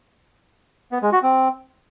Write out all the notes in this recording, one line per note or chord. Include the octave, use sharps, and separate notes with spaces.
B3
G#3
F#4
C4